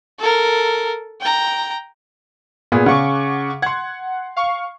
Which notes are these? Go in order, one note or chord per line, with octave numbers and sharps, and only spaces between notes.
A4 A#4
G5 A#5
A#2 B3 G#4
C#3 F#5 C#6 D6
F#5 C6 G#6
F5 C#6